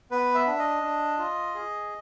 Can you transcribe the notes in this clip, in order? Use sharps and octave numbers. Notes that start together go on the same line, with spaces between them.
B3 B4
E5
D4
D#5
D4
F4
G#4